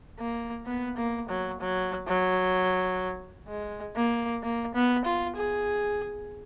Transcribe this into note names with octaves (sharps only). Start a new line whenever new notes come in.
A#3
B3
A#3
F#3
F#3
F#3
G#3
A#3
A#3
B3
F4
G#4